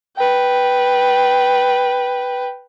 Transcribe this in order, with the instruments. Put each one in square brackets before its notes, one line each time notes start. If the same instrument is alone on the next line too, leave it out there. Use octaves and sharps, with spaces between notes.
[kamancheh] B4 G5